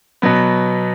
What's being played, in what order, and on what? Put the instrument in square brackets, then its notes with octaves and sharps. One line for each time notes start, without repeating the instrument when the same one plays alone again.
[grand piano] B2 F#3 B3